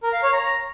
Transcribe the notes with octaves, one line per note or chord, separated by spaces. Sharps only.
A#4
F5
C#5
A#5